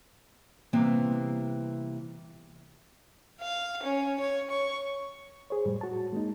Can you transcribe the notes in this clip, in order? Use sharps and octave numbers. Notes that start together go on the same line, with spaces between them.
C3 E3 G3 A#3 B3
F5
C#4
C#5
C#6
G#4 C5 C#5
F2 A2 G3
F#4 A5
G#3 A#3 D#4